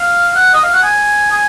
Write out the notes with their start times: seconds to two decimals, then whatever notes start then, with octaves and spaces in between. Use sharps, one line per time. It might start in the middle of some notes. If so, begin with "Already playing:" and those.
Already playing: F5
0.35 F#5
0.53 D#5
0.63 F5
0.73 F#5
0.83 G#5
1.31 G#5